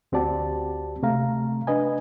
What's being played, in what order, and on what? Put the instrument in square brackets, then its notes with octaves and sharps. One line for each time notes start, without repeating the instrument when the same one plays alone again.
[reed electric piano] D2 C4 F#4 G4 D5 A5
C3 A3 F5 A#5
D4 B4 D#5 G#5